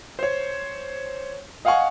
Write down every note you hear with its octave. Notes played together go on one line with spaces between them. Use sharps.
C5 C#5
D#5 F5 F#5 G#5 C#6